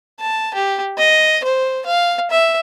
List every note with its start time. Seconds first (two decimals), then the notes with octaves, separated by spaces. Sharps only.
0.20 A5
0.54 G4
0.98 D#5
1.44 C5
1.86 F5
2.31 E5